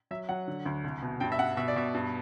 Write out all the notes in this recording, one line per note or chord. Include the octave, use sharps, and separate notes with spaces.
F#3 E5
F#3 F#5
D3
D2
C2
B2
G2 G5
E5
G2 F#5
B2 E5
D5
B2 E5
G2